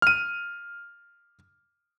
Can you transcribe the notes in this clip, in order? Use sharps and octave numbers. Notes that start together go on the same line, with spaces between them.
F6 D#7